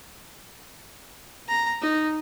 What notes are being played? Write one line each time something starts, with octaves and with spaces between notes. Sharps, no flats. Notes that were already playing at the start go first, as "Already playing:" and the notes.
A#5
D#4